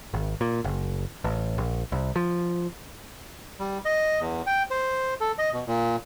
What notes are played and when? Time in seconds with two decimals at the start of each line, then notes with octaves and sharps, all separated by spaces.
0.14 G#1
0.41 A#2
0.64 F#1
1.24 A1
1.58 A#1
1.92 C2
2.16 F3
3.60 G3
3.85 D#5
4.20 E2
4.47 G5
4.71 C5
5.21 A4
5.38 D#5
5.53 B2
5.67 A#2